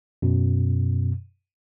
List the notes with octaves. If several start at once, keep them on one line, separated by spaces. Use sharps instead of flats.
F#2 B2